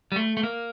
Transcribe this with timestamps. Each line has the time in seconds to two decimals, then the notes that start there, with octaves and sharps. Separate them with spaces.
0.12 G3
0.16 A3
0.37 A3
0.43 A#3